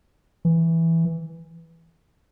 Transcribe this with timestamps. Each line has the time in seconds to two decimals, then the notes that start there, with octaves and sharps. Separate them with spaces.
0.45 E3